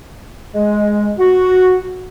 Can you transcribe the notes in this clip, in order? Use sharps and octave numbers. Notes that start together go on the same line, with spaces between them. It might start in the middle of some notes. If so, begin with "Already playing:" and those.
G#3
F#4